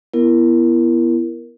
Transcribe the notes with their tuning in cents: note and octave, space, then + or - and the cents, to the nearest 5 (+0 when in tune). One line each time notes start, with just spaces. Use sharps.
B3 -10 E4 +25 A#4 +0